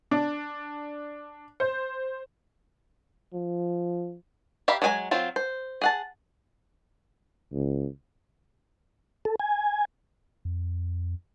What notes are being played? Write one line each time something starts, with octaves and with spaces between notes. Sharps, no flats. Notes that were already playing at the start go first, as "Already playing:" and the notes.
D4
C5
F3
G4 E5 F5 A#5 B5
F#3 G#3 C4 G#5 A#5
F#3 C4 F4
C5
G#4 F#5 A5
C#2
A4
G#5
F2